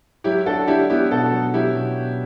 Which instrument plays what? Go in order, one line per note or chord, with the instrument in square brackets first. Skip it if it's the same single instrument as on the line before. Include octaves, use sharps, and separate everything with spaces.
[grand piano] F#3 [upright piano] E4 G4
[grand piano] D4 [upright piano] F#4 A4
[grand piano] D4 [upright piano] E4 G4
[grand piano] B3 [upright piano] E4 G4
[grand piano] B2 [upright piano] F#4 A4
[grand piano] F#3
[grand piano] F#3 [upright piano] E4 G4
[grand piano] B2
B2